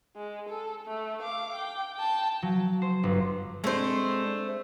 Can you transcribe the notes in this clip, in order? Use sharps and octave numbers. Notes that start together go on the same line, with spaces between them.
G#3
A4
A3
F5 D6
G5
G5 A5
F#3
C5
G1
G#3 A3 C4 D4 C5